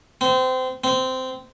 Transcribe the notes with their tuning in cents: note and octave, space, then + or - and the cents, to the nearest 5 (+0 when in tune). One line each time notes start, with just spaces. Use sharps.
C4 -25
C4 -15